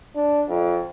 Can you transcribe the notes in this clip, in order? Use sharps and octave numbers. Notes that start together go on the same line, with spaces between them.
D4
F2